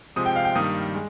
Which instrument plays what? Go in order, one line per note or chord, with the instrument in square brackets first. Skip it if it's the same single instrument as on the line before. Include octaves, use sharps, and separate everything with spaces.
[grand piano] C3 F3 G#3 D#6
G5
F5
G5
G2 D#3 G3 A#3 D#6
G#3